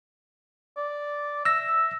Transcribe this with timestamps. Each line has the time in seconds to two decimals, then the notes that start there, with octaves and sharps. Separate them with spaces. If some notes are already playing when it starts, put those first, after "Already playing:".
0.77 D5
1.45 E5 E6 A#6